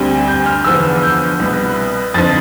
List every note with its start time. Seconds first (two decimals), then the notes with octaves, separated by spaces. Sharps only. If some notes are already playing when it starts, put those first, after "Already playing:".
Already playing: D2 D3 G3 C4
0.28 G6
0.46 F6
0.64 E2 D3 F3 B3 E6
1.03 G6
1.40 C2 B2 B3
2.14 F2 D3 F3 A6